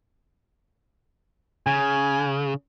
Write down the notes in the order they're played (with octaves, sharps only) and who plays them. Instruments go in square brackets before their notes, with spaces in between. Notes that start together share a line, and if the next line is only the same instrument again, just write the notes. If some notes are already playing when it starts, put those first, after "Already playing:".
[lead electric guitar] C#3 [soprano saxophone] G#5